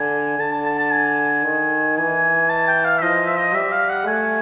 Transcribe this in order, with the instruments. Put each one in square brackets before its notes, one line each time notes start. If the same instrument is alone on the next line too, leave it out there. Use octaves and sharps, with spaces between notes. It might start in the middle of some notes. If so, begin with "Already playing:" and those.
Already playing: [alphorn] D3 [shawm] G#5
[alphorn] D3 [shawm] A5
[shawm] A5
A5
A5
G#5
[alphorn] D#3
[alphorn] E3 [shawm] G#5
[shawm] A5
G5
F5
E5
[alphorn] F3 [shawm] D#5
[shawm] E5
D#5
[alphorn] G3 [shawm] E5
[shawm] F5
F#5
[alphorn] A3 [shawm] G#5